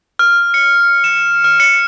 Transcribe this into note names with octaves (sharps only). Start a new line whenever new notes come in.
F6
C#7
E7
F6
C#7